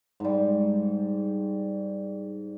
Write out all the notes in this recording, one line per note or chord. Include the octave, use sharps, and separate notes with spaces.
G#2 G3